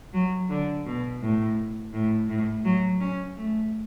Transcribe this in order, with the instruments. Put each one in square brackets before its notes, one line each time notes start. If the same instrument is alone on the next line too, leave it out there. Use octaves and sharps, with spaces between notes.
[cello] F#3
D3
B2
A2
A2
A2
F#3
C#4
A3